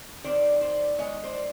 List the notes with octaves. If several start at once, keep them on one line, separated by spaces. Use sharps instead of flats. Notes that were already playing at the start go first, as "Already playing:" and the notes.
D#3 G3 C4 C5 D5
C5 D5
D#3 G#3 B3 C#5 D#5
C5 D5